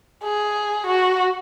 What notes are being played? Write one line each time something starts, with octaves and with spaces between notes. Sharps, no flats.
G#4
F#4